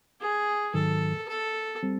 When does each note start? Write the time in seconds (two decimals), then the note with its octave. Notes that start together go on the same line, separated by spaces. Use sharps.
0.20 G#4
0.74 G#2 D#3 F#3 A4
1.28 A4
1.83 G3 C4